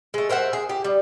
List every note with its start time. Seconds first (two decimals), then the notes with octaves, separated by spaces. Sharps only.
0.14 G#3 A3
0.29 A#4 C5 E5 F#5
0.53 G#4
0.69 G4
0.84 G3